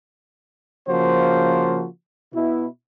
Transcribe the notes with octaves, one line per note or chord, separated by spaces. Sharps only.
C#3 F3 A#3 F#4 C5
B2 E4